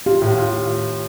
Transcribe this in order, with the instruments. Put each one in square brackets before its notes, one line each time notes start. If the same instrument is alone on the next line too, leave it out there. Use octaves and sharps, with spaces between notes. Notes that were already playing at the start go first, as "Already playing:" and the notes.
[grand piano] F4 [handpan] G4
[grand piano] A2
F4